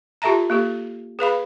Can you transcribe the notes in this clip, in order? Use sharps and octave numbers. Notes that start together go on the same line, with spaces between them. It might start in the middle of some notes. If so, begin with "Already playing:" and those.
F4 G4 A4 E5 A5 A#5
A#3 G4 A4
G#4 B4 F5 B5